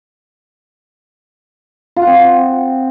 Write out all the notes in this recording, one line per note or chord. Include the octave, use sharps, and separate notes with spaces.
F4
F#5
C4